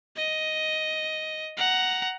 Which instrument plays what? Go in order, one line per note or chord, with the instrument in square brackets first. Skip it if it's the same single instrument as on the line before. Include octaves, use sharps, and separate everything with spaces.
[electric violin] D#5
F#5 A#5